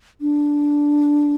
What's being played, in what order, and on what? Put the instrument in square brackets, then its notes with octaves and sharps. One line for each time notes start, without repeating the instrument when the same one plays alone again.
[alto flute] D4